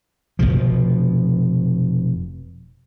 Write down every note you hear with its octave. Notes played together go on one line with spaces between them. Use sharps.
F1 A#1 B2 F3